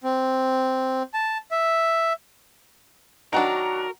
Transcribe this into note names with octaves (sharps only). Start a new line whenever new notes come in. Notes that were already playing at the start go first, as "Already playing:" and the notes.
C4
A5
E5
D#3 F#3 D4 F#4 A#4 F#5 A#5